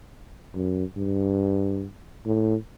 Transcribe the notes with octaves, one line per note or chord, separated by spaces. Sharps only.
F#2
G2
A2